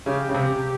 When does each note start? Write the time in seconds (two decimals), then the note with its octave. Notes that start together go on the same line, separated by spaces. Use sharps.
0.06 C#3 G4
0.29 C#3
0.34 C3